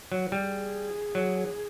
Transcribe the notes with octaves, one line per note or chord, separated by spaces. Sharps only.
F#3
G3 G#4
F#3